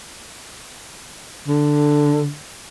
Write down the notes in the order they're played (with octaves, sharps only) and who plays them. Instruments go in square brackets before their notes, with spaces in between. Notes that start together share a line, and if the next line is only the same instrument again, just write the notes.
[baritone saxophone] D3